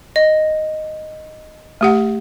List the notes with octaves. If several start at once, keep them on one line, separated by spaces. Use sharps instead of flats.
D#5
A3 G4 F#5